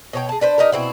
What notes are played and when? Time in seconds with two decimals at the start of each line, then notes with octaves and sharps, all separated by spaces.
0.13 B2 C#5 G5
0.29 G#4 A5
0.41 D4 B4 C5
0.58 D#4 G4 A#4
0.72 B2 C4 E4